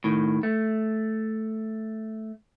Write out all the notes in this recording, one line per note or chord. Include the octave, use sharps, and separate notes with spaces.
A2 D#3
A3